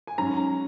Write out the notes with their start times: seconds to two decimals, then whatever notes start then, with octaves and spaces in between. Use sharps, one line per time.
0.07 G#5
0.18 G#2 F#3 C#4 A#5